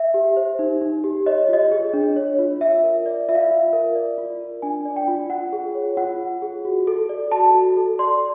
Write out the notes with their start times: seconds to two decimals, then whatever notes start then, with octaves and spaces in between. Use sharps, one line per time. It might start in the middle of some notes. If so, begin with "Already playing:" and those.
Already playing: E5
0.14 G4
0.37 C5
0.59 D#4
0.81 D#4
1.04 G4
1.26 C#5 D#5
1.49 F4 D#5
1.72 G#4
1.93 D4
2.16 C#5
2.39 F4
2.61 F4 E5
2.84 A#4
3.06 D5
3.29 F4 E5
3.35 F5
3.42 E5
3.51 F4
3.73 A#4
3.96 D5
4.18 F4
4.40 A#4
4.62 D4 G#5
4.85 D5
4.96 G5
5.08 F4
5.30 F4 F#5
5.53 G#4
5.75 C#5
5.97 F4 F#5
6.20 F4
6.42 G#4
6.65 F#4
6.87 A4
7.09 D5
7.32 F#4 A5
7.54 F#4
7.77 A4
7.99 D5 C6